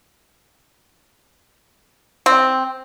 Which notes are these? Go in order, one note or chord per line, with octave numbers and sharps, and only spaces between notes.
C4